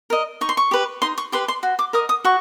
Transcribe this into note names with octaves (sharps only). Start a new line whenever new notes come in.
A#4 D#5
D#4 C#6
C6
C#6
G4 B4
D#4 C6
C#6
G4 B4 C6
C6
F#4
D6
A#4 D#5 D#6
D#6
F#4 C#6